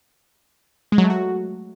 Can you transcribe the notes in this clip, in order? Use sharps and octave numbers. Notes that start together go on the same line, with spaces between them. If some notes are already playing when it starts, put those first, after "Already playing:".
G#3
F#3
A3
F#4